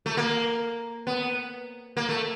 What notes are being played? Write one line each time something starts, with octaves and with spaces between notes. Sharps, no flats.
A3
A#3
B3
A#3
A3